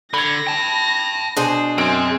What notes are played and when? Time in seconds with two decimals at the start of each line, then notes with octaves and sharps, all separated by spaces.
0.14 D3 B5 G#6 A#6
0.47 G5 A5
1.37 B2 D4 G#4 C5
1.78 F#2 C4 G#5 D7